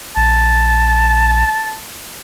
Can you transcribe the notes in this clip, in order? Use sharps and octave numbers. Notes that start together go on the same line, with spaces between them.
A#1 A5